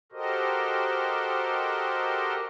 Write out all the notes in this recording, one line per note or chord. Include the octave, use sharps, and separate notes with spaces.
F#4 G4 A4 A#4 C5 D#5